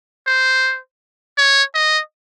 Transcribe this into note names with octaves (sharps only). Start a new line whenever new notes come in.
C5
C#5
D#5